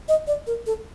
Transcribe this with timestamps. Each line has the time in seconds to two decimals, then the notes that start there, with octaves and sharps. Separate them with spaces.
0.09 D#5
0.27 D5
0.47 A#4
0.66 A4